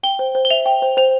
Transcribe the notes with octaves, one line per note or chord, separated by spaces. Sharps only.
G5 G7
C5
C5
G7
E5 F7
G5
C5
C5 F7